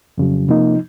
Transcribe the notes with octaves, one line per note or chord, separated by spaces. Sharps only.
F2 C#3 F#3
C3 F3 A#3 D#4